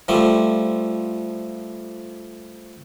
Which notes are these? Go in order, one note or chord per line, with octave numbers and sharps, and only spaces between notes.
F3 G3 A3